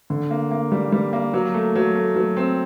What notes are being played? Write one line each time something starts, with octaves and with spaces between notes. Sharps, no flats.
D3
A#3
A#3
G3
G3
A#3
F#3
A3
F#3
A3
F#3
C4